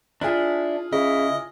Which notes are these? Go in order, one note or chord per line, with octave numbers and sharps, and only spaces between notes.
D4 E4 F4 G#4
C#3 E4 D#5